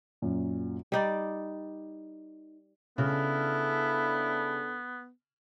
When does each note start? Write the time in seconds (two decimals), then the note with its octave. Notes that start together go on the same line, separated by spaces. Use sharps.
0.22 F#2 A#2
0.92 G3 D#4 D5
2.98 C#3 B3 D4 E4 A4